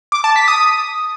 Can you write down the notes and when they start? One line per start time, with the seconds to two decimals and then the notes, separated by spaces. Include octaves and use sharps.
0.12 D6
0.24 A5
0.36 B6
0.48 D#6